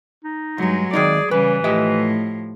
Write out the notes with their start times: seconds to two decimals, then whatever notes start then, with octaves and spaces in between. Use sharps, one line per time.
0.24 D#4
0.58 B1 G2 F#3 G#3
0.93 D#3 G#3 D#4 G#4 D5
1.31 C#3 E3 G3 B4
1.64 A2 F3 G4 D#5 E5